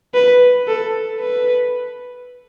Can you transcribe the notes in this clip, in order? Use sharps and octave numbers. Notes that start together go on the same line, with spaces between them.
B4
A4
B4